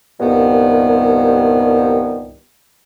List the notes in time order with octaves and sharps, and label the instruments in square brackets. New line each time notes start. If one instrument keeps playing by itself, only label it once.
[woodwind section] C2 G2 A#2 D#3 B3